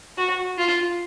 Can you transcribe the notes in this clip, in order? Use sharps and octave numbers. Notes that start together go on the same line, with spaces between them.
F#4
F4